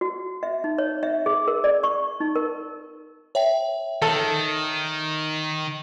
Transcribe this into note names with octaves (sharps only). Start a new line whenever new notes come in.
F#4
E5
D#4
C#5
E5
G#4
A#4
D5
C#6
D#4
A#4
C#5 E5 G5
D#3 A4